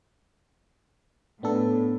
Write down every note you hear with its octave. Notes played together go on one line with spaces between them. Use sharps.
A2 B3 D4 A4